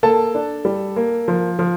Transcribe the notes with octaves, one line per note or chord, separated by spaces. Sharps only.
A#3 A4 A5
D4
G3
A#3
F3
F3